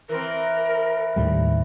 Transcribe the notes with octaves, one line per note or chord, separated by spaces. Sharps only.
E3 C4 A#4
D#2 A2 G3